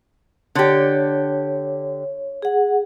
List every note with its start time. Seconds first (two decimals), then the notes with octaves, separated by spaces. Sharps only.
0.55 D3 G4 C#5
2.42 G#4 F#5